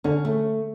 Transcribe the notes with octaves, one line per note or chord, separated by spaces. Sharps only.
D3 C#4
A3